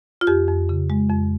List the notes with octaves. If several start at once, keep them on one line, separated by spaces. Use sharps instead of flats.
F4
F2 G4
F2
C#3
G#3
F2